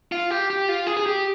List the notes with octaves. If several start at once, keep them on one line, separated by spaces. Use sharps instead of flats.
F4
G4
G4
F4
G#4
G#4
G4